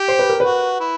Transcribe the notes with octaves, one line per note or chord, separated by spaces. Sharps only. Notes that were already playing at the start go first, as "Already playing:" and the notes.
Already playing: G4
C5
B4
A#4
F#4 B4
E4